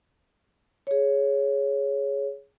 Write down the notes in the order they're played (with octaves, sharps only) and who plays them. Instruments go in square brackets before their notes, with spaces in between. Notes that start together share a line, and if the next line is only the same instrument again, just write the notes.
[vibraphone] G#4 C#5